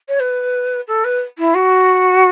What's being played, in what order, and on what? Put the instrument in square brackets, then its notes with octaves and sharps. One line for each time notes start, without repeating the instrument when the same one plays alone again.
[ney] C#5
B4
A4
B4
E4
F#4